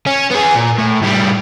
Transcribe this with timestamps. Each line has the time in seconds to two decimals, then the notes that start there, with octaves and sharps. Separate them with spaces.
0.06 C#4
0.31 B3 G#4
0.55 A#2
0.78 A2
1.01 A2 G3